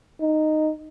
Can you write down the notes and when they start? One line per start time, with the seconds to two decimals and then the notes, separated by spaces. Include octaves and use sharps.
0.20 D#4